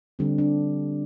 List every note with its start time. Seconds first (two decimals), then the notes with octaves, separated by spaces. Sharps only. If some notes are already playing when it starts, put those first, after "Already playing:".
0.19 D3 G3 C4 D4
0.38 D4